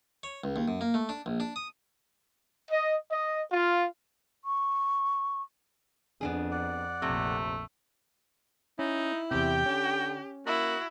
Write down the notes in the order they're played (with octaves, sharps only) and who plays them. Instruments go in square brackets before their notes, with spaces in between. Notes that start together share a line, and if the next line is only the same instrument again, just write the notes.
[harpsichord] C#5
C#2
D#2
F#2
A#3
A3
D4
A#1
D4
D#6
[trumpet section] D#5
D#5
F4
[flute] C#6
[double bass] F2 [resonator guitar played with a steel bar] B3 D4 G#4
[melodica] D5 F#5
[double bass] A#1 F2 [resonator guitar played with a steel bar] C3 [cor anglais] A3
[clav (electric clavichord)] C#4 [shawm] D#4 [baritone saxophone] E4
[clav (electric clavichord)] E2 C3 [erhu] G4 [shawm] G5
[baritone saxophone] D3 [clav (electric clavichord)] C#4
[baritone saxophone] A#3 [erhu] E4 [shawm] F#4